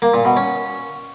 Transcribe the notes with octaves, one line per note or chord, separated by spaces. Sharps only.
A#3
A#2
B2
C#4